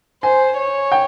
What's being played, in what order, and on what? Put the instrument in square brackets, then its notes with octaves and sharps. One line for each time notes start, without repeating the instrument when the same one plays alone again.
[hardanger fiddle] C5 [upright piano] G#5
[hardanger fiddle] C#5
[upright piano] G5